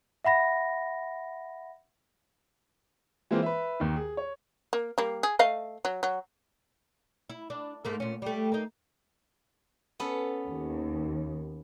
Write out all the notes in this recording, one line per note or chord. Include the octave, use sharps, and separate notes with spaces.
E5 F#5 B5 A#6
E3 G#3 A#3 C4 F4
B4 E5
D#2 D#3
G#4
C#5
A#3
G3 A#3
G#4
A3 D#5 F5
F#3
F#3
E4
D4
G#2 A3 A#3
A#2 C#4
G3 A3
A#3 D#4
B3 C#4 A4
D#2